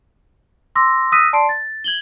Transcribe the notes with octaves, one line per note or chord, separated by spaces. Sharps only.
C6 D6 E6 A#6
D#6 E6 F#6 A#6 B6 D#7
D5 A5 C6 C7 D7
A6
G#6 F#7 G7